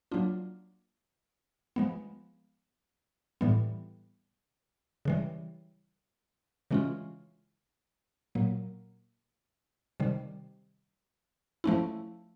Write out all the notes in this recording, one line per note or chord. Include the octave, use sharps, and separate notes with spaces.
F#3 A#3 D4 F4
F3 G#3 B3
A2 E3 G3 B3
C#3 E3 G3
C#3 E3 G#3 C#4 F4
A#2 F#3 A#3
C3 D#3 G3
F3 A3 C#4 E4